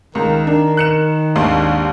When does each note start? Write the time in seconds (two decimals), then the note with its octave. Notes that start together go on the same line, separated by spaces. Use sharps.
0.15 C#2 D#3 A#4
0.47 D4 A#4
0.77 F#6 C#7 E7
1.36 G#1 D#2 D4 C6